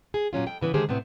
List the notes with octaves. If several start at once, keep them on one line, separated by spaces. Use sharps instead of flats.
G#4
A#2 F#3 C#4 F4
F2 G5
C#3 E3 B3
D3 D#3 G#3 G4 G#4 C5
A2 C3 B3 C4